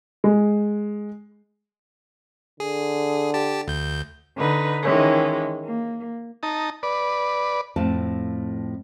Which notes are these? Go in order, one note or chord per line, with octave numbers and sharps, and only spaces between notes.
G#3
D3 G#4
G4 A5
D2 G6
D3 D#4 B4
D#3 E3 G#3 C#4
A#3
D#4 A5 A#5
B4 D5
F2 A2 A5